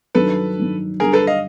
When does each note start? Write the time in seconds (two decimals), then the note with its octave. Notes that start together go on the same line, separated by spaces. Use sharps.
0.15 G2 D#3 F#3 A4 B4
0.57 G2 D#3 F#3
0.99 G2 D3 G3 G#4 A#4
1.13 A4 B4
1.27 D#5 F5